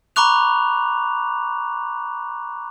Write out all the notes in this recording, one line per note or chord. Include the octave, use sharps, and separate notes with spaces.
A#5 B5 C#6 D6 F#6 F7